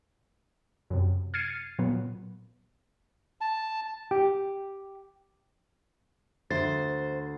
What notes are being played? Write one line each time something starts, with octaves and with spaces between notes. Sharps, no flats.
F#2 C3
F6 G#6 A6 C7 C#7 D#7
A#2 F#3 B3
A5
G4
D2 C5 A6